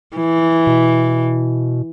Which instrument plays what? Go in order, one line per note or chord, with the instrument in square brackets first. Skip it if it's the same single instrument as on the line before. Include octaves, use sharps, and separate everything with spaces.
[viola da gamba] E3
[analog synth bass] B2